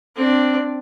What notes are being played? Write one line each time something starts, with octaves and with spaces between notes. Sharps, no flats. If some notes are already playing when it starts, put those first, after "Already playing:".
C4 D4